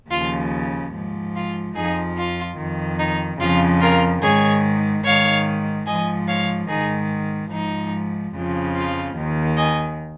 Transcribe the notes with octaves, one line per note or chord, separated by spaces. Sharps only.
D#2 C#3 F3 F4
G#2 F3
F4
F2 F3 D#4 G#4
F4
F2 D#3
D#4
F2 C#3 F3 F4
F4 A#4
G#2 D#3 G#4 C#5
G#2 D#3 C#5 F5
G#2 F3 D#5 G#5
C#5 F5
G#2 D#3 D#4 G#4
G#2 F3 D#4
F2 C#3 F3
F4
D#2 D#3
D#5 G#5